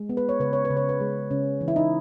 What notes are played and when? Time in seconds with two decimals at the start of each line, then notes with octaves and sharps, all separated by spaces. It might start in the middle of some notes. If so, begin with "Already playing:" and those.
Already playing: G#3
0.09 B3
0.17 B4
0.29 C#5
0.40 C#3 B4
0.53 C#5
0.65 B4
0.70 C#3
0.77 C#5
0.89 B4
1.01 G#3
1.31 C#3 C#4
1.61 E3
1.68 E4
1.76 D#4